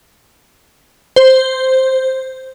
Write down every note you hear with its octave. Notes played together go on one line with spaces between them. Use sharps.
C5